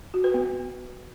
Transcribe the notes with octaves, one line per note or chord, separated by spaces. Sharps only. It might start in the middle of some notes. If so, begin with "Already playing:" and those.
F#4
B4
B3